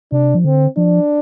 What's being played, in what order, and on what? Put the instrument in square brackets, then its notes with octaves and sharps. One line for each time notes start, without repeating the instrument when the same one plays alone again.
[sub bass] C3 [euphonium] D4
[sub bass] F3
[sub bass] D3 [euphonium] C4
[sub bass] F3 [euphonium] D4